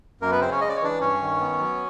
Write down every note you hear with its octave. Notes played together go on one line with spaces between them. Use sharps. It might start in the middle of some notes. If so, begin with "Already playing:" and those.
F#2 A#3 A#4
B3 B4
C#3 C4 C5
C#4 C#5
G#3 D#5
D5
C#5
E3 D4 D5
G2 C#4 C#5
D#3
B3
F#3